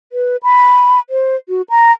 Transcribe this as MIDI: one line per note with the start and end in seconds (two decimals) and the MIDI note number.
0.12 0.37 71
0.43 0.99 83
1.10 1.36 72
1.49 1.62 66
1.70 1.92 82